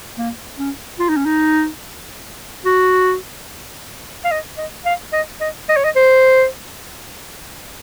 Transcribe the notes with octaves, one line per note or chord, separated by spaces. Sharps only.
A#3
C#4
F4
D#4
C#4
D#4
F#4
F5
D#5
D#5
F5
D#5
D#5
D#5
C#5
D#5
C5